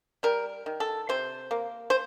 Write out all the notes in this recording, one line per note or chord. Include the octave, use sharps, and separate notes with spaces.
G3 A#4
D#3
A4
C3 C5
A#3
C5